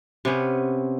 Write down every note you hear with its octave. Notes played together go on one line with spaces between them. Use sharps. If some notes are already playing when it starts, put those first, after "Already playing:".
C3 B3 C#4